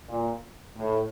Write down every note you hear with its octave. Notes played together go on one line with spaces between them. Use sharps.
A#2
A2